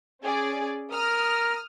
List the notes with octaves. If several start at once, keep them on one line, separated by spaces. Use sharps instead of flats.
C#4 G#4 D5
A#4 D#6 F6